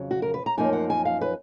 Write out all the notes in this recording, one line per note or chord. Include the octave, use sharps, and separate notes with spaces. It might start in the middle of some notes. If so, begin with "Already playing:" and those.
Already playing: F2 C#3 F#3
F#4
A#4
B4
A#5
F#2 F3 A#3 D#4 G#5
F#5
G#5
F5
B4